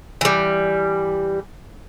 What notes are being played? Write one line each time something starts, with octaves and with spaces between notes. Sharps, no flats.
E3 G3